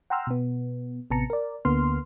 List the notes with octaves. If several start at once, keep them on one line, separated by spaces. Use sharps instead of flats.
F#5 G5 A#5 C6 E6 F6
B2 B3
A1 C3 B3 A5 A#5 C#7
A#4 D5
D2 D3 A#3 B3 C6 F6